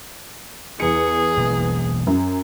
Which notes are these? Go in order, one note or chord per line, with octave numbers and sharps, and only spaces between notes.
E2 G#4 C#7
B2 E3 A#3
F#2